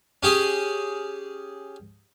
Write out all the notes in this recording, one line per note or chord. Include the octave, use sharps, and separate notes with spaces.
C#4 G4 G#4